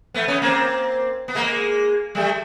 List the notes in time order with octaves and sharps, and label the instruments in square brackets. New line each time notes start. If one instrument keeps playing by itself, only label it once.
[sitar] A3 B3
B3 C#4
A#3 C4
B3
G#3 A#3
G3 A3